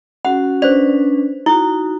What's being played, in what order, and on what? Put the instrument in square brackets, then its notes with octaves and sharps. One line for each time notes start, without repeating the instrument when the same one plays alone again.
[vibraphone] C#4 F#4 [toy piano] F#5
[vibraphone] C#4 D4 B4 [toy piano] C5 D5
[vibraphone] D#4 F#4 [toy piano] E4